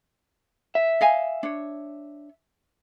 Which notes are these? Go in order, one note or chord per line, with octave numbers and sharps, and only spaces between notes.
E5
D#5 F5 G#5
D4 C#5